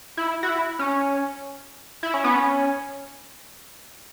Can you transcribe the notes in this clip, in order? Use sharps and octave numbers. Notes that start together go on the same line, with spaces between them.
E4
F#4
E4
C#4
E4
C#4
B3
C#4